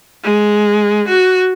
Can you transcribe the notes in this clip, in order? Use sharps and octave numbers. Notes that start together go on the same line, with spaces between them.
G#3
F#4